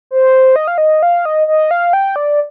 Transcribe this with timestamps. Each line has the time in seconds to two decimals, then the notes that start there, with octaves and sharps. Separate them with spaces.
0.11 C5
0.56 D#5
0.68 F5
0.78 D#5
1.03 F5
1.25 D#5
1.47 D#5
1.71 F5
1.93 G5
2.16 D5